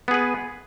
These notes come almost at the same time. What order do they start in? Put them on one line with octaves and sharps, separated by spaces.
B3 G#4 B4